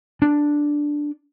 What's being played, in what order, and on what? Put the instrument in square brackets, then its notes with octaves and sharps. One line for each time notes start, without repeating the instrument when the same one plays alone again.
[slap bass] D4